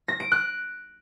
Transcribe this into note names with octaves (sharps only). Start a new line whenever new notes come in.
A#6
D7
F#6